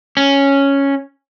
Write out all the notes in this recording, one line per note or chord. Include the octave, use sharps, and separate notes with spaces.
C#4